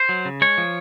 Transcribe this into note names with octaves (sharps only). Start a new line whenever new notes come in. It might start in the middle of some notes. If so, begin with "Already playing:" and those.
Already playing: C5
F#3
C#3
G#3 C#5
F3